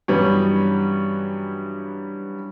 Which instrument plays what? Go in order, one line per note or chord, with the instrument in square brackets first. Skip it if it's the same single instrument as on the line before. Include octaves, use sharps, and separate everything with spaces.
[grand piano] G2 E3 F#3 G3 B3 C#4